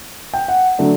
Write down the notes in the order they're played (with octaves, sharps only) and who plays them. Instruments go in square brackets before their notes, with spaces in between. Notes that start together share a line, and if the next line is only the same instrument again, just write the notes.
[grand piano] G5
F#5
D3 F#3 A3 D4